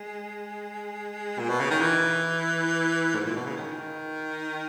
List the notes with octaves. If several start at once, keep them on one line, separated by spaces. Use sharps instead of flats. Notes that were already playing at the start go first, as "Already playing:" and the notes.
Already playing: G#3
A#2
B2
C#3
D#3
E3
G#2
A#2
B2
C#3
D#3